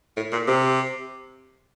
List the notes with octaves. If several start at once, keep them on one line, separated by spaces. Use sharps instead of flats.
A2
A#2
C3